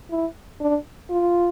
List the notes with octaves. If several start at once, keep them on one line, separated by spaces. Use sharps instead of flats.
E4
D4
F4